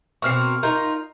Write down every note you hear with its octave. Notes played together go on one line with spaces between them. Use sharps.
B2 A#3 C4 C#6 F6 C7
D#4 F4 A#4